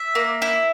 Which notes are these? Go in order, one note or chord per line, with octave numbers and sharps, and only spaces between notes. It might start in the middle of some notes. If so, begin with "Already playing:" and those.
Already playing: E5
A#3
E4